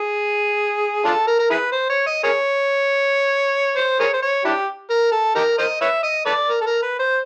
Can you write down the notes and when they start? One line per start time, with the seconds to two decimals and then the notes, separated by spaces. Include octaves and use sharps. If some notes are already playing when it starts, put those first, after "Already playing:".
Already playing: G#4
1.05 D4 F4 A4
1.27 A#4
1.39 A#4
1.50 E4 G#4 B4
1.72 C5
1.90 C#5
2.06 D#5
2.24 G#4 A#4 C#5
3.77 C5
4.00 G#4 A#4 C#5
4.13 C5
4.22 C#5
4.45 D4 E4 G4
4.90 A#4
5.12 A4
5.35 D#4 G4 A#4
5.58 A#4 C5 D#5
5.81 B4 C#5 E5
6.03 D#5
6.26 A4 B4 D5
6.49 A#4
6.61 A4
6.66 A#4
6.83 B4
6.99 C5